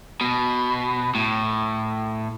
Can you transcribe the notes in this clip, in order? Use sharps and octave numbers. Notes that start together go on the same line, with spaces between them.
B2
A2